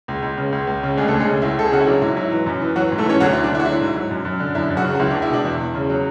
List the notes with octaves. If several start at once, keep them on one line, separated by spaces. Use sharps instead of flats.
C#2
C#2
C#3
C#2
C#2
C#3
D2 G#3 G#4
A3 A4
D2
G#3 G#4
C#3
C#2 E4
C#2 A4
G#4
C#3 F#4
E4
F#3 D4
G#2 E4
F#3 E4
E3
F#2
E3
E3 F#3 F#4
G#2
A3 A4
E3 C#4 C#5
D2 F#3 F#4
E4
D2
D4
D3 E4
F#4
F#3 E4
G#2
F#3
F#2
F#2
D3
F#2 E4
F#2
F#3 F#4
C#3
F#4
C#2 E4
D4
C#2
E4
B2 D4
E2 E4
E2
C#3
F#3